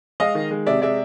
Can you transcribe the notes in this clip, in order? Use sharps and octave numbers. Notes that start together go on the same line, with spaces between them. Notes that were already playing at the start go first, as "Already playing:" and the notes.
G#3 D#5 F5
D#3
G#3
C3 D5 E5
G#3 D5 E5